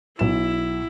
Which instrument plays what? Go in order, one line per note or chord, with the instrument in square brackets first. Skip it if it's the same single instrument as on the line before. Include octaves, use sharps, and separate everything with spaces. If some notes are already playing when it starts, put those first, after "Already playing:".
[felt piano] B1 E7 [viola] E4